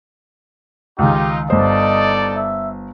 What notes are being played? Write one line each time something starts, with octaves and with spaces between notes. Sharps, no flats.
C#2 D#3 D#4 F4 G4
G1 D#4 A4 C5 D5 D#5
E5